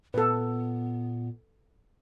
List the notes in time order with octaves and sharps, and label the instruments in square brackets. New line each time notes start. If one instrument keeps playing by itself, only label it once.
[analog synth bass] A#2 [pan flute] B3 [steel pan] A4 B4